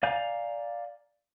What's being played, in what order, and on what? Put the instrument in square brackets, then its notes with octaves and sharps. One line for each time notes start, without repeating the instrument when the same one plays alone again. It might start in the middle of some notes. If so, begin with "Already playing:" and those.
[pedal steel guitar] D5 F5 G#5 A#5 G6